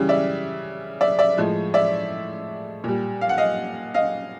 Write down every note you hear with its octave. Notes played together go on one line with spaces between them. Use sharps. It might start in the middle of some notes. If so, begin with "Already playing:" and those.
Already playing: C#3 E3 G3
D5 E5
D5 E5
D5 E5
A2 F3 G#3
D5 E5
A#2 G3
F5
F#5
D#5 F5
D#5 F5